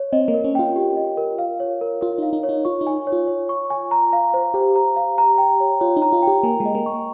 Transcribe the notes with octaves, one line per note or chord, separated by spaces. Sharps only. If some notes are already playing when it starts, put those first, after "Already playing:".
Already playing: C#5
C4 D#5
A#3
A#4
C#4
F4 G5
G4
D#5
A#4
F5
C#5
A#4
F4 A#4
D#4 F5
D#4
C#5
D#4
F4 C#6
D#4
G#5
C#5
F4
C#5
C#6
G#5
A#5
F5
C5
G4 C5
A#5
F5
A#5
G5
C#5
F4 C#5
D#4
A#5
F4
G4 G5
A#3 G#5
G#3
D#5
A#3
C#6